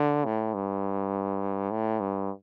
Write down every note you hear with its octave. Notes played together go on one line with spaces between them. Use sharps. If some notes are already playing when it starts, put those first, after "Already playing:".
Already playing: D3
A2
G2
A2
G2